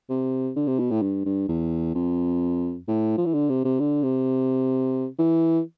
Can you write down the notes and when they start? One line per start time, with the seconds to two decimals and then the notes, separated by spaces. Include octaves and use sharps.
0.10 C3
0.56 D3
0.67 C3
0.79 B2
0.91 A2
1.02 G2
1.26 G2
1.49 E2
1.95 F2
2.88 A2
3.17 F3
3.26 E3
3.34 D3
3.50 C3
3.64 C3
3.80 D3
4.03 C3
5.19 E3